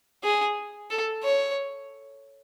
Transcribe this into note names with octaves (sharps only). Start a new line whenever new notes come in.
G#4
A4
C#5